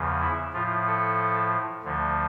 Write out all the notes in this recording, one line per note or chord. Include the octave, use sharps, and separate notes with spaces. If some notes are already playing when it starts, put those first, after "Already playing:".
Already playing: E2 C#3 F3
E4
A2 F3 F4
A4
D2 D3 F3